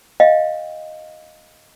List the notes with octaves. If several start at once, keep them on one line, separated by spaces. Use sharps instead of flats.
D#5 F5 G5